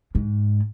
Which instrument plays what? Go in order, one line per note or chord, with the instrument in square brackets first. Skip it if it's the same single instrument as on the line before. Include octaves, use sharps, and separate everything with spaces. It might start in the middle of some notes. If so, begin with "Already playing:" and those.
[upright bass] G#2